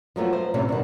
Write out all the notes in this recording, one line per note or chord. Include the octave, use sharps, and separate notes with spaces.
F3 F#3 A3 B3 F4
C5
A2 C3 E3 C#4
G2 B2 D#3